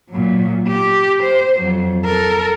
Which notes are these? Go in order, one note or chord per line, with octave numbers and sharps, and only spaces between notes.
A#2 F#3
G4
C5
F2 F#3
A4 A#4